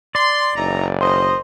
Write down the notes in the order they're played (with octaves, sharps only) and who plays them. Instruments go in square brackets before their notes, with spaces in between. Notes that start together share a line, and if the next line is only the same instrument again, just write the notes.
[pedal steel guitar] D5 [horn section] C6
[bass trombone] F#1 [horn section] E3 D#4 A#5
[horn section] D#3 D#5 [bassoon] C5